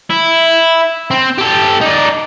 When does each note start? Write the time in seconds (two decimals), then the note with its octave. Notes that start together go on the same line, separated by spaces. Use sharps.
0.10 E4
1.11 C4
1.38 G4 A4
1.81 D#4 D5